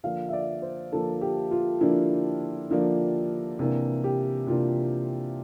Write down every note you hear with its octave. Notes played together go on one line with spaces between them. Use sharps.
D3 F3 A#3 D4 F5
E5
D5
C5
D3 F3 A#3 D4 A4
G4
F4
D3 F3 A#3 D4 E4
D3 F3 A#3 D4
C3 E3 A#3 D4
G4
C3 E3 A#3 D4 F4